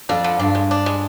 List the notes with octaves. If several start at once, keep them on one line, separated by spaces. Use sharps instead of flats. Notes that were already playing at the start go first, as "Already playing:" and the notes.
F2 D4
D3
G2 D4
G#3
D4
G#3